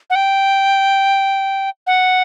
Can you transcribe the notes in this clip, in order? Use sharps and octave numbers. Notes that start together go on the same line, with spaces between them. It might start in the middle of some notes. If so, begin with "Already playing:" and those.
F#5
G5
F#5